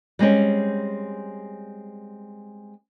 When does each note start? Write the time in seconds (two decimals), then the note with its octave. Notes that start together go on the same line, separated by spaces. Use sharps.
0.19 G3 G#3 C4 C#4